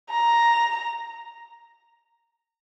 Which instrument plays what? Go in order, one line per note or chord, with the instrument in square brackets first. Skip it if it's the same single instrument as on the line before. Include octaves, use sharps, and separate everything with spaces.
[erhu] A#5